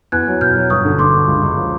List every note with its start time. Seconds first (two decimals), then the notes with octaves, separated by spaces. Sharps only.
0.12 E2 F#6 G#6
0.27 F#3
0.41 B2 F6 G6
0.56 F#3
0.70 G1 C#6 D#6
0.85 D3
0.99 D3 C6 D6
1.13 D3
1.28 C#2
1.43 C#2
1.57 F3